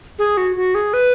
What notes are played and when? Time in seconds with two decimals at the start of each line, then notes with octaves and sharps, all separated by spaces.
0.19 G#4
0.37 F#4
0.56 F#4
0.75 G#4
0.93 B4